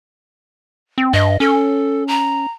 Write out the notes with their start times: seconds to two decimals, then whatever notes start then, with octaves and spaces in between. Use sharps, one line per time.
0.98 C4
1.13 G2 D#5
1.40 C#4 A4
2.08 A#5